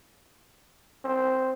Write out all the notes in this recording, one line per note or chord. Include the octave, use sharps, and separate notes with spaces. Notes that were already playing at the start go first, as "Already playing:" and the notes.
C4